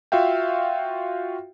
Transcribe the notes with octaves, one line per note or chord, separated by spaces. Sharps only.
F4 F#4 E5 F5 G5